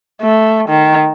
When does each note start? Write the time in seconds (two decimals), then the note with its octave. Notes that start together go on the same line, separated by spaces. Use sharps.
0.22 A3
0.69 D#3